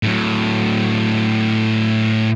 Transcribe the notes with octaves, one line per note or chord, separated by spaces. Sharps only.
A2 F#3